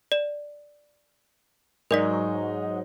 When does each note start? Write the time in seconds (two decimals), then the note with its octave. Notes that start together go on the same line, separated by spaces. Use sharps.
0.12 D5 E7
1.91 G#2 F#3 G#3 D#4 A#4 D5 B6